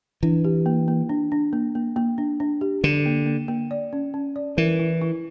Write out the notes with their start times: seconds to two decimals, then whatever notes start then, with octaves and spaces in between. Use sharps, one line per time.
0.23 E3 D4
0.44 G4
0.66 A#3
0.88 A#3
1.09 D4
1.32 D4
1.53 A#3
1.75 A#3
1.96 A#3
2.18 D4
2.40 D4
2.61 G4
2.84 D3 D4
3.06 A#3
3.26 A#3
3.48 A#3
3.71 D5
3.93 C#4
4.14 C#4
4.36 D5
4.57 E3 A#4
4.79 E4
5.01 E4